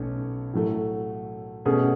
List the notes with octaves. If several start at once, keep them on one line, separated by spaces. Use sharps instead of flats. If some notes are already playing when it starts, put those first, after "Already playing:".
Already playing: B1 A3 C#4
A2 F#3 A3
B2 A3 C#4 G#4